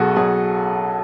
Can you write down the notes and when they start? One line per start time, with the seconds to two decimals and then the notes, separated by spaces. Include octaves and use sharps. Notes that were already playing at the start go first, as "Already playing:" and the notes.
Already playing: B1 B2 F#4 G#4 A4
0.16 B1 G#4